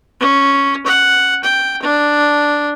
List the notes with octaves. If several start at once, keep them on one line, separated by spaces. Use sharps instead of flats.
C#4
F#5
G5
D4